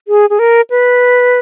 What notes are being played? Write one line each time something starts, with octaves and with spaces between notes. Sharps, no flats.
G#4
G#4
A#4
B4